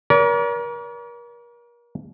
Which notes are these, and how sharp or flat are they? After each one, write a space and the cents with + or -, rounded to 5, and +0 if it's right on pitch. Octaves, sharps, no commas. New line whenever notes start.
A#4 +35 D5 -45